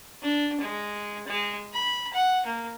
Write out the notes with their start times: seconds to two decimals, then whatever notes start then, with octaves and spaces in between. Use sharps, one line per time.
0.22 D4
0.60 G#3
1.27 G#3
1.73 B5
2.13 F#5
2.45 A#3